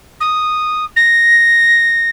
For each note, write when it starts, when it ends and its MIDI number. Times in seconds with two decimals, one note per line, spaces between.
0.20 0.84 87
0.96 2.10 94